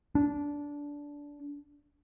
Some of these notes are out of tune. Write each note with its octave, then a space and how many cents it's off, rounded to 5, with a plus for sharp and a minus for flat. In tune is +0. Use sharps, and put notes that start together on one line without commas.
D4 -15